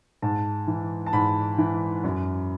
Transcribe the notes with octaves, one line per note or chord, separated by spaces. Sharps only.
G#2 A5
E3
A5
G#2 B5
E3
F#2